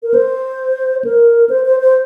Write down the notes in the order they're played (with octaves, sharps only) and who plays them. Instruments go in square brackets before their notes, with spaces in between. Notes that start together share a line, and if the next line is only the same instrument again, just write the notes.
[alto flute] A#4
C5
A#4
C5
C5
C5